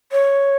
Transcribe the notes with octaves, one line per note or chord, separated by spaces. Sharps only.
C#5